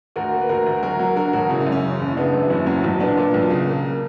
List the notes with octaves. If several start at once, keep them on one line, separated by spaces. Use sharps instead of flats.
D2 F#4 A#4
A#3
B4
D2 F#4 A#4
D2
F#3 F#4 A#4
F#3
D3 F#4 A#4
E1 F#4 A#4
C#3 C#4 E4
C#4
F#2
C#4
C#3
F#1
E4
C#3 B3 D4
F#2
F#1 C#4 E4
F#3 C#4 E4
B1
A#2 B3 D4
A#2
B1
C#3
A#3